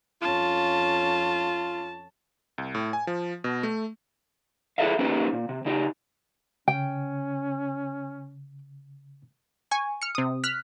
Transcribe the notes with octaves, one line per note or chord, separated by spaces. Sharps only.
F2 C#4 F4 A5
C2
A2
G#5
F3
B2
A3
E4 G#4 A4 B4 E5 F5
A#3 C#4 D#4 G4 B4 C5
A#2
C3
C#3 D#4 G4
C#3 C#4 G5
G#5 C#6
F6 C#7
C3 D#6
F6 F#6 B6